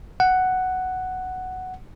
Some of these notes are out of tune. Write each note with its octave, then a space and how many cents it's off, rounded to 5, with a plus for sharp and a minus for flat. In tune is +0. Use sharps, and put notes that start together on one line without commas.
F#5 +5